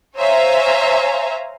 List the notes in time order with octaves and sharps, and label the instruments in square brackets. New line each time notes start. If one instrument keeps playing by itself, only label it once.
[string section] C5 C#5 E5 F5 G#5 A#5